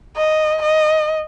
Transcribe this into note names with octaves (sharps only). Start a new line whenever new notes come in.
D#5
D#5